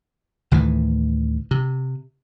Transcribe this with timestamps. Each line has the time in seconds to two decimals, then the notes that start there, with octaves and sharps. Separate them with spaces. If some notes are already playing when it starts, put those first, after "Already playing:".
0.51 D2 A2 D#3 E3
1.51 C3